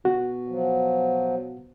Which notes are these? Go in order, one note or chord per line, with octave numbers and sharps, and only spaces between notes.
B2 F#4
F3 F#3